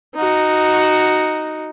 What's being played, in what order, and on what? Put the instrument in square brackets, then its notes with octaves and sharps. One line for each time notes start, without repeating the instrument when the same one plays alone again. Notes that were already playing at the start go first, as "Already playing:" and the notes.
[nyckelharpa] D#4 F#4